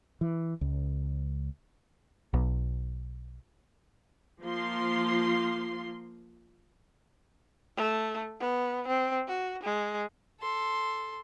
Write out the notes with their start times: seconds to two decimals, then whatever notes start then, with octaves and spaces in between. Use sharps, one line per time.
0.21 E3
0.61 C#2
2.33 B1
4.42 F3 A#3 F4 C6
7.77 A3
8.40 B3
8.88 C4
9.28 F#4
9.63 G#3
10.41 A4 C6